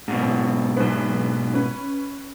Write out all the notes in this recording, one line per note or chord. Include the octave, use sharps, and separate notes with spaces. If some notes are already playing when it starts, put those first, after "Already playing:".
G#2 B2
A1
B1 B3
C#4 B4